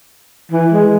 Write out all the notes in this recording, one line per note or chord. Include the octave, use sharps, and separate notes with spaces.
E3
G#3